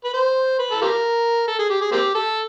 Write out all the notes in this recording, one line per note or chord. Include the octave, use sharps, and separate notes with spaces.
B4
C5
B4
A4
F4 G4 A#4
A4
G#4
G4
G#4
A#3 C4 G4
A4